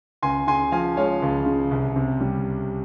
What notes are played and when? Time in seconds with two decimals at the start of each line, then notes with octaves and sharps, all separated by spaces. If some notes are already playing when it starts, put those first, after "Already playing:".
0.22 C#2 G#5 C6
0.47 C#3 G#5 C6
0.72 F3 F5 G#5
0.97 G#3 C#5 F5
1.22 C#2
1.46 C#3
1.71 C2
1.96 C3
2.20 G3